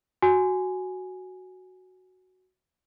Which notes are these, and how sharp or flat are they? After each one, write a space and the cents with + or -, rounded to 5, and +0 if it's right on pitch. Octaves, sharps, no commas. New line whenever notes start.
F#4 +0 G#5 +0